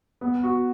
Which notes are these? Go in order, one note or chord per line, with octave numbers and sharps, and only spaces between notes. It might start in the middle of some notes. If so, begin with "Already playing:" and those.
B3
F#4